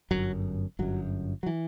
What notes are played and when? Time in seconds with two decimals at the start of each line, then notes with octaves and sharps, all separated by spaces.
0.11 G1 F#2 F#3
0.79 G1 F#2 F#3
1.43 F#3
1.46 E3